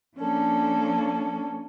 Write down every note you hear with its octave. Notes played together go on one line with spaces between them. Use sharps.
F3 A#3 C#4 D4 A4